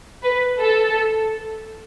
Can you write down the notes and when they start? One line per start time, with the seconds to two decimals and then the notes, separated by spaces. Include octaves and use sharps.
0.23 B4
0.60 A4